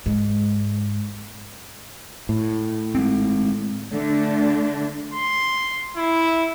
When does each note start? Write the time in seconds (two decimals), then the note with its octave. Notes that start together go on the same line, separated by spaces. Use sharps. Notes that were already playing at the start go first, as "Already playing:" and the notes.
0.06 G#2
2.29 A2
2.95 G#3 B3 C4
3.93 D3 A3 D4
5.14 C6
5.97 E4